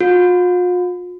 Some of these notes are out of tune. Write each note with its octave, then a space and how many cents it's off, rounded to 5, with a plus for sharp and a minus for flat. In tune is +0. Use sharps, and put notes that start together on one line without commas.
F4 +45